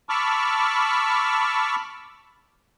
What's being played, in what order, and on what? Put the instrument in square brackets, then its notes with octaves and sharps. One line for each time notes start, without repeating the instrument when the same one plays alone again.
[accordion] A5 B5 C#6 D6 E6 F6